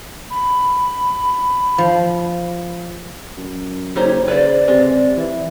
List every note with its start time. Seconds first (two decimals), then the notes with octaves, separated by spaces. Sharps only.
0.31 B5
1.78 F3
3.37 F#2
3.96 F#1 G3 D#4 C5 C#5
4.28 C#3 B4 C5 D5
4.68 C3 G#3
5.17 E3